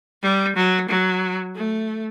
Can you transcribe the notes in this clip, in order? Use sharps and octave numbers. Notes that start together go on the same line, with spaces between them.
G3
F#3
F#3
A3